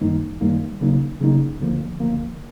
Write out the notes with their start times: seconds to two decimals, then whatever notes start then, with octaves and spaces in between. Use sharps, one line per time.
0.01 F#2 D#3 G3 A#3 D#4
0.41 F#2 D#3 G3 A#3 D#4
0.81 C#3 F#3 A#3 D#4
1.21 C#3 F#3 A#3 D#4
1.60 D2 D3 F3 A#3
2.00 D2 D3 F3 A#3